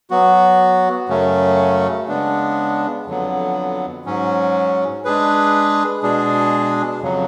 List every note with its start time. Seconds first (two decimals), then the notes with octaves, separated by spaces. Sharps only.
0.10 F#3 B3 F#4
1.09 F#2 C#3 F#3 A3 C#4
2.08 C#3 G#3 B3 D4
3.06 F2 D3 F#3 B3
4.06 G#2 F#3 C#4
5.04 G#3 D4 G#4 B4
6.03 B2 G#3 D4 G#4
7.02 F2 C#3 F#3